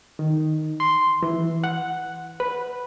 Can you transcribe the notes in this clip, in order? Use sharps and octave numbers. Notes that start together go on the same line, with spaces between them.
D#3
C6
E3
F#5
B4